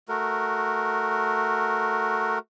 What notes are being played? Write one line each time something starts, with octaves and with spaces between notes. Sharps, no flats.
A3 F#4 A#4